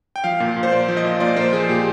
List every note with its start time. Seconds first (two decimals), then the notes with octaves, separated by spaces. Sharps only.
0.16 G5
0.24 F3 F5
0.40 A#2
0.56 A#2
0.63 C5
0.72 A#3 D5
0.88 F3
0.97 D#5
1.05 A#2
1.16 D#5
1.20 A#2 D5
1.37 A#3 C5
1.53 F3 G#4
1.69 A#2 G4